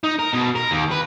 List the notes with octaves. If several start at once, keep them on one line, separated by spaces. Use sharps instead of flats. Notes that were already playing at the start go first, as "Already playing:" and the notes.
D#4
A#4
B2
A#4
D#2
B4